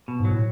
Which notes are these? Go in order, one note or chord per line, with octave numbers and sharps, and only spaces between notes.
B2
G#2 F#3
A2